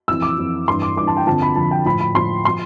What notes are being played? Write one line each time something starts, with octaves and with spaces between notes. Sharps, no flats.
F2 E3 E6
D6
F2 E3
G2 E3 C6
D6
G2 E3 D6
A5
G5
F2 D3 F3 A5
B5
F2 D3 F3 A5
G5
A2 F3 B5
B5
A2 F3 C6
F3 C6